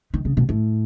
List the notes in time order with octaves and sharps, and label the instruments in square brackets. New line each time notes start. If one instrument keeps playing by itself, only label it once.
[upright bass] D#3
C#3
B2
A2